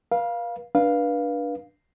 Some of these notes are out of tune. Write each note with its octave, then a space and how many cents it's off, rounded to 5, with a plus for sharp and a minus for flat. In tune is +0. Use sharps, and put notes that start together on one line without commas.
B4 -45 F5 +0
D4 +0 B4 -25 F5 +0